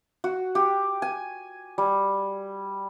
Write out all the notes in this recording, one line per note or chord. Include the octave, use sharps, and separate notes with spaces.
F#4
G4
G#5
G3